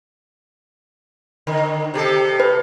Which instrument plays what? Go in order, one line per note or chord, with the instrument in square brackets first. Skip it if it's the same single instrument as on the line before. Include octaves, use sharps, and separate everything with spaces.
[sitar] D3 D#3
C3 G4 A4
[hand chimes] B4